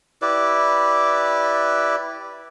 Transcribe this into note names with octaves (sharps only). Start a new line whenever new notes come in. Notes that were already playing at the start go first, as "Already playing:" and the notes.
E4 G4 B4 D5